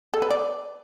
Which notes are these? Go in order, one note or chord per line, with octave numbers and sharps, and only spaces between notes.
A4
B4
D5